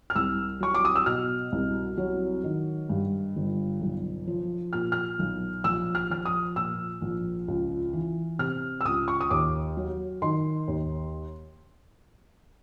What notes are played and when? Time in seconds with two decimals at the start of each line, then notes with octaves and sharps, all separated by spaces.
0.10 F6
0.15 C2 E6
0.60 F#3 C#6
0.74 D6
0.85 D#6
0.96 E6
1.06 B2 F6
1.52 C2
1.98 F#3
2.44 D#3
2.89 G2
3.36 G1
3.81 B1
4.27 F3
4.73 A#2 F6
4.92 F6
5.19 B1
5.64 A#1 E6
5.95 F6
6.10 F3 F6
6.25 D#6
6.56 A#2 E6
7.02 A#1
7.48 C#2
7.93 E3
8.39 C3 F6
8.81 E6
8.85 C#2 D#6
9.08 C#6
9.21 D#6
9.30 D#2 D6
9.77 F#3
10.22 D#3 C6
10.68 D#2